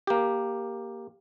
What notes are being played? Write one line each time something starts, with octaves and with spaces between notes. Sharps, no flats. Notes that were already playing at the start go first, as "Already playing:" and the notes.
A#3 G4